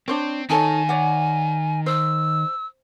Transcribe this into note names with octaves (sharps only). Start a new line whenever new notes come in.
C4 D4 C5 C#5
D#3 D#4 A4 C#5 G#5
C#5 D5 F#5
C5 E6